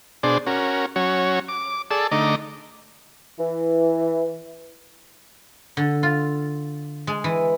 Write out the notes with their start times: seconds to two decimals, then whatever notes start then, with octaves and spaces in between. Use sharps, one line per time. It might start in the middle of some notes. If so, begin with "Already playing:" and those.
0.23 B2 D4 G#4 C5 D5
0.47 C#4 F#4 A#4
0.96 F#3 C#4 F#4 C#5
1.49 D6
1.91 G#4 A4 D5 A5 E6
2.12 D3 A3 D#4 D#5 A#5 D6
3.39 E3
5.77 D3
6.03 F4
7.07 G#3
7.24 E3